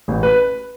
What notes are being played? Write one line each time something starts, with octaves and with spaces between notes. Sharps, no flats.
A1
B4